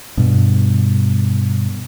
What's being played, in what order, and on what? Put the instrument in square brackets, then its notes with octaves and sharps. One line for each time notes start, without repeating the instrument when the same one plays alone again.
[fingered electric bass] G2 B2